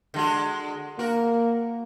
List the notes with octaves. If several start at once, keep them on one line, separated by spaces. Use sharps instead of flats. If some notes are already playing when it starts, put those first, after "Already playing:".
D3 G#3 F#4
A#3 F#4 A#4